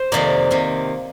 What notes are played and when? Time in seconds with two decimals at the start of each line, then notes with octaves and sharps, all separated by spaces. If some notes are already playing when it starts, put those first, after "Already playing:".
Already playing: C5
0.12 F2 C3 D#3 A#3 D5
0.50 C3 D#3 A#3